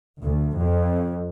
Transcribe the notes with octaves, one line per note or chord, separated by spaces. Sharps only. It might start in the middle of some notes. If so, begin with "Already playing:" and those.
D2
F2